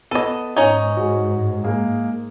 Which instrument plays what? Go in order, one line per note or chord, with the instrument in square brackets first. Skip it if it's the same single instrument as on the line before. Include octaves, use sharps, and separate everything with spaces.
[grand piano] B3 D#7 [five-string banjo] A4 D#5
[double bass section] G#2 [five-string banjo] C#4 D#4
[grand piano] F#4 G#4
G#3 A#3 G#4